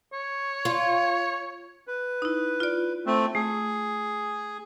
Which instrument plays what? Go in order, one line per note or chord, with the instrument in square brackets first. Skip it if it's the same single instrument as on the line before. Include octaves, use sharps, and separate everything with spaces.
[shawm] C#5
[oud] F4
[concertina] B4
[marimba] D#4 E4
F4 D5
[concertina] A3 C4
[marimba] A3 [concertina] G#4